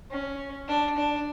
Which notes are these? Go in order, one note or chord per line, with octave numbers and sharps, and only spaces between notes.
C#4
D4
D4